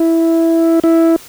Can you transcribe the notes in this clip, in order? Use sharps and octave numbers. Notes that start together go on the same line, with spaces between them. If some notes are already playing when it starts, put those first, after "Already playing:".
Already playing: E4
E4